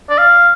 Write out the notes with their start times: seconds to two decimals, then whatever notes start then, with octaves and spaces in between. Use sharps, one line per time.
0.10 D5
0.18 F5